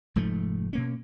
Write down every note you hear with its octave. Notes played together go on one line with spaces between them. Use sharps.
F1 G#2 F3 A3
B2 A#3 C#4